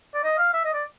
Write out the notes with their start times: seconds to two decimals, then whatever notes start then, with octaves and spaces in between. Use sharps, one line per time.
0.14 D5
0.24 D#5
0.38 F5
0.53 E5
0.64 D#5
0.74 D5